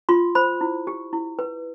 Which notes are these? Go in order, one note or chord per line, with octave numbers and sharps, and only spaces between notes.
F4 C6
C5 B5
E4
G4
E4
B4